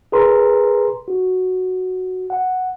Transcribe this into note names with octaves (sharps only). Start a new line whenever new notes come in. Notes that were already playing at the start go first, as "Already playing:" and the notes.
G#4 A#4 B4 A#5 C6
F#4
F#5